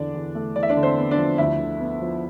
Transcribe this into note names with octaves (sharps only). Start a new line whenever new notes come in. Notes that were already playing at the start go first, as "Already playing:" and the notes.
Already playing: E2 D3 D4 D5
E2
A3
E2 D5
E5
D4 D5
D3
C4 C5
B3
D4 D5
F3
D2 E4 E5
D3
B3
F3